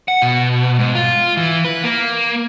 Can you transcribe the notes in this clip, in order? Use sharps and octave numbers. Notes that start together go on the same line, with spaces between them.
F#5
B2
G#2
F4
E3
B4
A#3